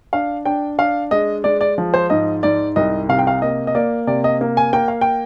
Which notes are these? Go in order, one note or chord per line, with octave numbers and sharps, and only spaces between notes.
D4 F5
D4 G5
D4 F5
G#3 D#5
G#3 D5
D5
F3
C5
G#2 D#5
G#2 D5
C2 D#5
C3 F5
G5
F5
A#3 D#5
D#5
A#3 D5
C3 D5
D#5
A#3
G#5
A#3 G5
F5
G5